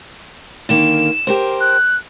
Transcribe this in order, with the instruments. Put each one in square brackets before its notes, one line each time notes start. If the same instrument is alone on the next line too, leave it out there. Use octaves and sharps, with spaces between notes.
[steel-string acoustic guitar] D3 D#3 A#3 [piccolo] E7
[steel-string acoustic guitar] G4 A#4 C5
[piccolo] F#6